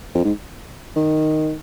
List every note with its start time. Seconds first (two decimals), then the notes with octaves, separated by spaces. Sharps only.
0.14 F2
0.24 G#2
0.96 D#3